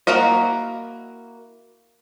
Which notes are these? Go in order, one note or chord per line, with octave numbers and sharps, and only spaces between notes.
A#3 E4 F#4 A#4 D#5